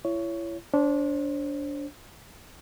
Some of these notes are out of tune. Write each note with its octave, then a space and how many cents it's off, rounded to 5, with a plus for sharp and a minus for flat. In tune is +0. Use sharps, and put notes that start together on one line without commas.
E4 +35 C#5 +10
D4 -20 C5 +30